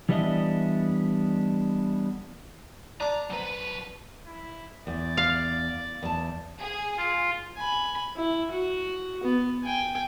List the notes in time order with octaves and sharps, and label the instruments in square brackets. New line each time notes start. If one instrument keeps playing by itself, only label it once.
[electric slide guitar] E3 G3 B3 D4 D#5 E5
[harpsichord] D4 D5 [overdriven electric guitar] A#5
[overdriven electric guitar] B1 B4
[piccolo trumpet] E4
[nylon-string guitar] E2 [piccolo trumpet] D5
[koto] F5
[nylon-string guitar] E2 A5
[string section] G#4
[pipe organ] F4
[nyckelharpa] G#5 B5
E4
F#4
B3
G5 G#5